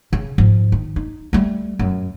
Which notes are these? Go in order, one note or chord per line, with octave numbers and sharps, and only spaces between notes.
C#3
G#2 F3
D#3
D#4
G3 A3
F#2